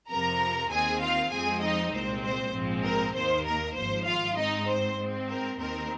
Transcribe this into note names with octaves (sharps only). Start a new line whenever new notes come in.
F2 C3 F3 A#4 A#5
D#2 D#3 C4 G#4 G#5
F4 F5
F2 F3 G#3 C4 G#4 G#5
D#4 D#5
C2 A#2 G#3 C4 C5
C5
A#1 G#2 F3 G#3 C4
A#4
D#2 D#3 A#3 C5
A#4
G#1 G#2 F3 C5
F4 F5
G#2 G#3 C4 D#4 D#5
C5
G#2 G#3 C4
A#4
D#2 D#3 C4 A#4